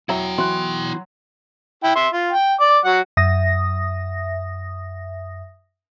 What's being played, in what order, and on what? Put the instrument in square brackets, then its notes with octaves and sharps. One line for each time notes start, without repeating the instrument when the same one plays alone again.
[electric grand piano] F#3 [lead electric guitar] E4 G5 [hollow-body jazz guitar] E5 A#5
[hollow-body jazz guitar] E3 B3 F#4 [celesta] C6 F#6
[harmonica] E4 G5
E5 C6
F4
G5
D5 D6
F#3 F#5
[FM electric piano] F#2 E5 D#6 A#6